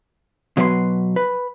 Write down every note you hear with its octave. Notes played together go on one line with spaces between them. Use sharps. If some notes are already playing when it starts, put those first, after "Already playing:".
B2 F#3 B4 D#5 C6
B4